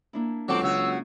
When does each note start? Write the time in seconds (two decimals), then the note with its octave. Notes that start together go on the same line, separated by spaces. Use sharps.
0.13 A#3 D4 E4
0.48 C#2 F#3 C4 A4 D6
0.63 C#3 F#4 E6